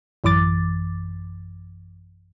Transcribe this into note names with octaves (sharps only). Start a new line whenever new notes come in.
A1 F#2 E3 D6 A6